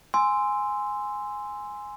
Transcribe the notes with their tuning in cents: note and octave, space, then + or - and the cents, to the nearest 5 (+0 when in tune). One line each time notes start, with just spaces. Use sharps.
G#5 -5 C6 -10 E6 +5